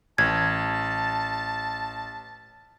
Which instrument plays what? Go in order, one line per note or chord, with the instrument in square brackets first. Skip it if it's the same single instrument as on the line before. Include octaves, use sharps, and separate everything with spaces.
[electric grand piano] A1 [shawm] A5 [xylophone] G#6